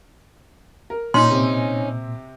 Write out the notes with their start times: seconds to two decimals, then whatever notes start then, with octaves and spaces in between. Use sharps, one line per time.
0.90 A#4
1.14 A#2 C#4 D#4 C6
1.30 C3 C4